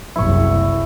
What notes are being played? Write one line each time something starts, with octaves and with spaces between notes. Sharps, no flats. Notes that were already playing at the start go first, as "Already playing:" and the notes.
F#1 C2 E4 C#6